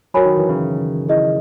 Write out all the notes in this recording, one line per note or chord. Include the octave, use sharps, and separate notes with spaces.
F#3 F#4 A#4 C#5 G#5 B5
D#3
E3
C#3
E4 G#4 D#5